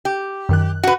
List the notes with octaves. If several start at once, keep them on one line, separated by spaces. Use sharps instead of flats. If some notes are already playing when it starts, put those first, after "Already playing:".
G4
F#2 D#3 F#6
F#4 B4